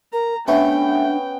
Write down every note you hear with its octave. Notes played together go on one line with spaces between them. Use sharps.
A#4 A#5
A3 B3 C#4 D4 G5